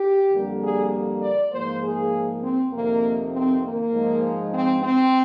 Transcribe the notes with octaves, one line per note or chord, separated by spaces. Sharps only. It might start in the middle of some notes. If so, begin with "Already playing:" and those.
Already playing: G4
F2 D3 G3 A#3
G#4
D5
G#2 F3 A#3 C5
G#4
C4
F2 C3 D#3 A#3
C4
A#3
G#2 F3 G#3
C4
C4